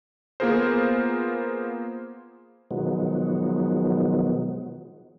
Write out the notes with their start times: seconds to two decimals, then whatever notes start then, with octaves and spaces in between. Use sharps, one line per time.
0.40 A#3 B3 F4 G#4 A#4 C5
2.71 B2 D#3 F3 F#3 G#3 B3